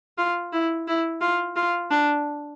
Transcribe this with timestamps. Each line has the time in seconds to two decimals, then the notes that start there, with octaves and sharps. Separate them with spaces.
0.18 F4
0.52 E4
0.87 E4
1.21 F4
1.56 F4
1.90 D4